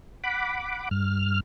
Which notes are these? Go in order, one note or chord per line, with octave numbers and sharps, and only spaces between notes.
F#5 B5 D6
G2 F6